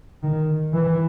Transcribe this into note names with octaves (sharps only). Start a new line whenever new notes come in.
D#3
E3